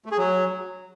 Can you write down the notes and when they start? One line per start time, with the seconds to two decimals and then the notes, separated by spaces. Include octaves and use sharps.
0.05 A3
0.12 G#4
0.18 F#3